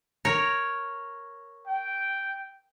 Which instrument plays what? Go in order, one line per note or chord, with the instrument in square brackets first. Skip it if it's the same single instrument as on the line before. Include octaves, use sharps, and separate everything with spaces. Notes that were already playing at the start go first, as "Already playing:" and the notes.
[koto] A#4 C#5
[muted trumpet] G5